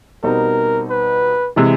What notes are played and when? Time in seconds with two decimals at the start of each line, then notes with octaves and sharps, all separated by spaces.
0.23 B2 G3 C4 D#4 A#4
0.90 B4
1.56 C3 E3 G#3